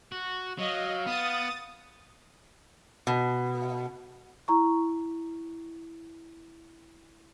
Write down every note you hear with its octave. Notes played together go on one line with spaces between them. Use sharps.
F#4
F#3 D#5 F5
B3 D#6 A6
B2
E4 A#5 C#6